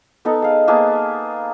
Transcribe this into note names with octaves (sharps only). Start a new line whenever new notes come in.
B3 D#4 A4
G#4 F5
A#3 B3 G#4 A5